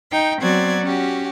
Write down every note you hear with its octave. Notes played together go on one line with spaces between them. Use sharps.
D#4 G5
F#3 B3 C4 F#4 D5 G#6
C#4 F#4 G4